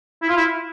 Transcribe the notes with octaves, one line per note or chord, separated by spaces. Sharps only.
E4
F4
E4